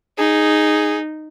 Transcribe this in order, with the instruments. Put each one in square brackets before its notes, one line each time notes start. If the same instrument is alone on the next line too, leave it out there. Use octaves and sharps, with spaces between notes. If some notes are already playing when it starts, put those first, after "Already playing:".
[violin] D#4 [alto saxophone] G#4